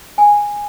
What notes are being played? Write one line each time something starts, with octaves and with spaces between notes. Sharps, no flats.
G#5